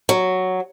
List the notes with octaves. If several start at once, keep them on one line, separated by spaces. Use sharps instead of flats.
F#3